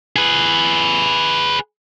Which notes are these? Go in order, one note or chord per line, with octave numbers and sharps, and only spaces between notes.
G#4 B4